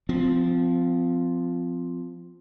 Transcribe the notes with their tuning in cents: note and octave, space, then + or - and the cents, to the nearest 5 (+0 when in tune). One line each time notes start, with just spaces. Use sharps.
F3 +0 C4 -25